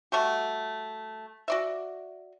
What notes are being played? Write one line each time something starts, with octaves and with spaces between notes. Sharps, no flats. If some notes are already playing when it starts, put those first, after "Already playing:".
G3 A3 F#4 G4
F#4 D5 E5